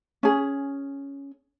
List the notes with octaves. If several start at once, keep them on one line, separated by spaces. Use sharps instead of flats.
C#4 G#4